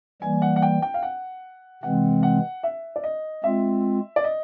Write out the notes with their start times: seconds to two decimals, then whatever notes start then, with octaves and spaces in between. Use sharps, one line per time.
0.22 E3 G3 A#3 G#5
0.42 F#5
0.56 F#5
0.62 G5
0.82 G5
0.94 F5
1.03 F#5
1.83 C3 E3 G#3 C4 F#5
2.23 F#5
2.63 E5
2.96 D5
3.04 D#5
3.43 G#3 C4 F4 E5
4.16 D5
4.24 D#5